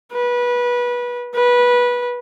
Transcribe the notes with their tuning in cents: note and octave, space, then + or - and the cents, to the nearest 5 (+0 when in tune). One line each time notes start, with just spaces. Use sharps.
B4 -25
B4 -20